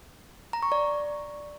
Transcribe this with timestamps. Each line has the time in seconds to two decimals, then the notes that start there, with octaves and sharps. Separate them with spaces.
0.53 A#5
0.62 C#6
0.72 D5